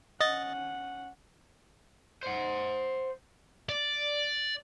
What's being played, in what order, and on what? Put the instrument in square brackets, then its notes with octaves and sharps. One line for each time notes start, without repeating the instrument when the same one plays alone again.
[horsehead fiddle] C#4 F#5 [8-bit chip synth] D#5 A6
[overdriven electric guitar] C5 F#5
[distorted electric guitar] D5